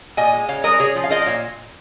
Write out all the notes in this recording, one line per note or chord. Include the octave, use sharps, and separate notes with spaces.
A#2 D#5 G#5
G#3
C#3 C#5 F5
G#3 A#4 D#5
C#3 G#4 C#5
F3
F5
F3 A#4 D#5
A#2 C#5 F5